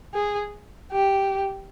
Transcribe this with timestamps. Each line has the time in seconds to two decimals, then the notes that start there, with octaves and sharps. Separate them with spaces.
0.14 G#4
0.92 G4